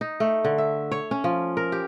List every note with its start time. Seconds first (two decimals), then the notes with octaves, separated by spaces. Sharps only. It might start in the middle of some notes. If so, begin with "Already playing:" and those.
0.01 D#4
0.20 A3
0.45 D3
0.58 E5
0.92 C#5
1.11 C#4
1.24 F3
1.57 A#4
1.72 G4